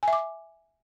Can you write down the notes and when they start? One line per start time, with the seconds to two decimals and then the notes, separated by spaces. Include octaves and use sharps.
0.03 G#5
0.08 E5
0.13 D6